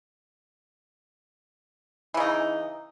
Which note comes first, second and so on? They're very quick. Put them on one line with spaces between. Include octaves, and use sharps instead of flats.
E3 C#3 D#4